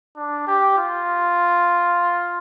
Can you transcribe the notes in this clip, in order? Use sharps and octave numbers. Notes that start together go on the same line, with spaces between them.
D4
G4
F4